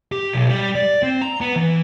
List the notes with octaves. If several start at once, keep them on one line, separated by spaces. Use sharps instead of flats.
G4
B1
G3
D5
C4
A#5
B3
E3